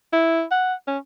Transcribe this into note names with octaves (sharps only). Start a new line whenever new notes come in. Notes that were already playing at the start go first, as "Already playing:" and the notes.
E4
F#5
C#4